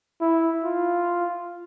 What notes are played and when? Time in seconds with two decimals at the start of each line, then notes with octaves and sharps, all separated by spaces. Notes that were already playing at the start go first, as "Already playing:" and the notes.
0.21 E4
0.64 F4